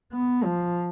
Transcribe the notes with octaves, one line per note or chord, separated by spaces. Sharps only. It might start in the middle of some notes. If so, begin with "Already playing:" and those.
B3
F3